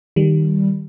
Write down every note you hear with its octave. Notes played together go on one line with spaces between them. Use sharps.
D#3 G3